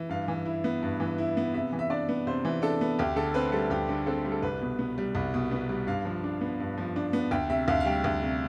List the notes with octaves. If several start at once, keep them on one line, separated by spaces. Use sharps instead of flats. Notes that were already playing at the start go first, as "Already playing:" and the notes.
Already playing: E3
G2 F5
E3
E4
B3
G2
E3
E4
B3
C3 E5
E3
E5
D4 D5
B3
C3 C5
E3
D4 A4
B3
D2 G4
D3 A4
C4 B4
G3 A4
D2 G4
D3
C4 A4
G3
A4
C2 B4
B2
B3
G3
C2
B2
B3
G3
G2 F5
F3
D4
B3
G2
F3
D4
B3
D2 G5
C3 E5
D2 F5
F5
G3 G5
D2
C3